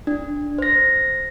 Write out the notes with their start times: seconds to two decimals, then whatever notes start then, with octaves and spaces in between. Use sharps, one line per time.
0.07 D4
0.58 C5 A#6